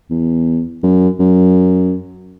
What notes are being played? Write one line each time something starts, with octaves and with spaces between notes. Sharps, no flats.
E2
F#2
F#2